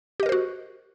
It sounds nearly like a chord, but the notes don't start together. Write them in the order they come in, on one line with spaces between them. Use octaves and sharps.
G4 D#5 A#4 C5 F#4